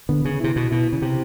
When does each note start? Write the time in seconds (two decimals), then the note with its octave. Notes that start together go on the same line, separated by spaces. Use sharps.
0.09 D3 B3
0.25 C#3
0.40 C3 E4
0.56 B2
0.71 B2 E4
0.93 C#3
1.02 C3 G4